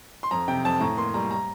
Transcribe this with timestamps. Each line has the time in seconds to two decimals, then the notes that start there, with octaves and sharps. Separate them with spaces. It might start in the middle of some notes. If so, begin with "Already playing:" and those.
0.23 C6
0.31 F2 A#5
0.48 C3 G5
0.65 F2 A5
0.81 A2 A#5
0.98 A#3 C6
1.14 G3 A#5
1.31 A#5